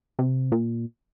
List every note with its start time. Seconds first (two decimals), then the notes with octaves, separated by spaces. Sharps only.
0.19 C3
0.52 A#2